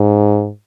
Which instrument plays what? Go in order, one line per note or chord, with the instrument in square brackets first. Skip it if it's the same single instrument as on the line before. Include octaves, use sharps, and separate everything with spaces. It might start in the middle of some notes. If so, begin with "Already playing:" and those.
Already playing: [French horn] G#2